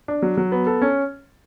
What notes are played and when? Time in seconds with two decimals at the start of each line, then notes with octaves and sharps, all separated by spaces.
0.08 D4
0.22 F#3
0.37 F#3
0.52 B3
0.67 A4
0.82 C#4